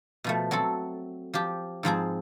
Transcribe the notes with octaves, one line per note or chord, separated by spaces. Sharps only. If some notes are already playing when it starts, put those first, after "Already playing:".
B2 F3 A3
F#3 C4 F#4 A4
F3 G4
G#2 F3 C4 G#4